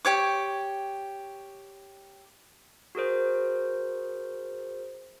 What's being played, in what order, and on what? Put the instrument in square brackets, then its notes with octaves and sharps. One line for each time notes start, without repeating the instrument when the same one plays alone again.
[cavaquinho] G4 C#5 D6
[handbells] F#4 G#4 A#4 C5